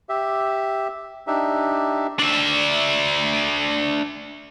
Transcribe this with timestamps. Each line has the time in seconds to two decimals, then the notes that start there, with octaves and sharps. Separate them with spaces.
0.09 G4 E5
1.27 D4 D#4 G4 E5
2.19 D4 E5